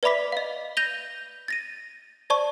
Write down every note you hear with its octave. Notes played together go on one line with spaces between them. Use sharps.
B4 D5 E5 B5 D6 B6
D#5 F5
G6 A#6 D#7 F7 G7
A6 A#6 D#7
C5 D5 A5 C#6